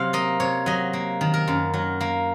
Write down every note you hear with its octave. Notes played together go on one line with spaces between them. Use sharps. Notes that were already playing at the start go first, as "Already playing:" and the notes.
Already playing: C3 F#3 F5
A#3 D#5
C3 C#5
F#3 D#5
A#3
D#3
A#4
F#2
F#3
A#3